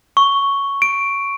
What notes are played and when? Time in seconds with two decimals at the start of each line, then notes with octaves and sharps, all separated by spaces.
0.17 C#6
0.82 D7